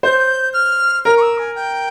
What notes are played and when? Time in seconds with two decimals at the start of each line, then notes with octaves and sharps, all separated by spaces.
0.03 C5 G6
0.54 F6
1.05 A#4 F6
1.17 C#6
1.22 E6
1.38 G#5
1.55 G5